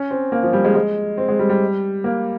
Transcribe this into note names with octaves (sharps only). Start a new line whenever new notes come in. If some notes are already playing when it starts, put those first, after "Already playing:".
Already playing: C#4
C4
A#3
F3
G3
G#3
G#3
C4
G#3
G3
G3
A#3